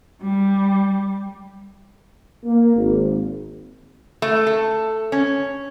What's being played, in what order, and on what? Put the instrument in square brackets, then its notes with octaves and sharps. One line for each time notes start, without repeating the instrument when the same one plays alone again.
[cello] G3
[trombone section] A#3
G#1
[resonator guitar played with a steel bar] A3
A4
C#4